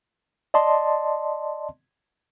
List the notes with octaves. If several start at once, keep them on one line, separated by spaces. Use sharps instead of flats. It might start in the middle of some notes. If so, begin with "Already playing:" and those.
D5 D#5 A5 C6